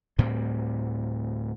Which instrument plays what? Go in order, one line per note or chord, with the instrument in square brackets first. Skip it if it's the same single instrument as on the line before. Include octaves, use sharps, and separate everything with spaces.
[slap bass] D2 A2 G3 C4